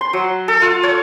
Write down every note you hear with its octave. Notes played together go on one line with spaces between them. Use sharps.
C6
F#3
A4
F4
C#5